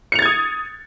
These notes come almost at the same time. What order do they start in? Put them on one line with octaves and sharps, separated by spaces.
C#7 F7 A6 G#6 D#6